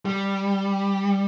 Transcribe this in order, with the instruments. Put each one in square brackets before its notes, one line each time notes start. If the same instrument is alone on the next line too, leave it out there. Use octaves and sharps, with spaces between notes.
[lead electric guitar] G3